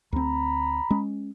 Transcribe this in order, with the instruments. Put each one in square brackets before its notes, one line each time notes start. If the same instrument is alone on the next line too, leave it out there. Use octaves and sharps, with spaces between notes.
[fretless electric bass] D2 C4 [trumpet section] A#5 B5
[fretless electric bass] G#3 C#4